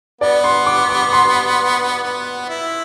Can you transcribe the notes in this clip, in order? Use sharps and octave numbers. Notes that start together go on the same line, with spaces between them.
B3 D5
C6
D6
D6
C6
B3
E4